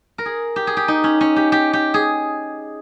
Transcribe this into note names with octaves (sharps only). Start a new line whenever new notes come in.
A#4
G#4
G4
G#4
G4
D#4
C#4
C#4
G4
G4
G4
G#4